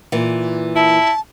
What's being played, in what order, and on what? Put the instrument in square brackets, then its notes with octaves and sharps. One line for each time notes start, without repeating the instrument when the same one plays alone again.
[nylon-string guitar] A#2 E3
[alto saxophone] E4 [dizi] A5